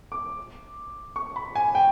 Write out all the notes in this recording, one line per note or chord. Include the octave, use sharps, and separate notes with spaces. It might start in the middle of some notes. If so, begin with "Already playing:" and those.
D6
C#6
B5
G#5
G5